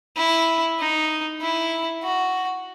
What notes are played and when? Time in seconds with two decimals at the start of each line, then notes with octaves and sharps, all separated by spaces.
0.17 E4
0.79 D#4
1.41 E4
2.03 F#4